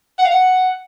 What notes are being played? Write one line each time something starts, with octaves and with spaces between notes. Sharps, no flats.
F#5
F5
F#5